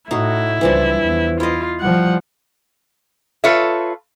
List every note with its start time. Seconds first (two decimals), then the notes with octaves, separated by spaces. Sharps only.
0.11 A2 D#4 E4 F#4
0.61 C#2 E3 F3 G3 D4
1.02 E2
1.40 E4 F4 D#5
1.80 F3 G3 F#5
3.44 F4 A4 B4 C#5 E5